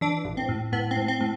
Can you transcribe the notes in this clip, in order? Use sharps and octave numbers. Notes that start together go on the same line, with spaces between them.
E3 D4
A1
C4
A2
A2 B3
C4
A2
C4
A2